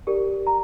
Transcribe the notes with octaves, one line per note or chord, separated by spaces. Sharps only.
D#4 G4 A#4 D5
A#5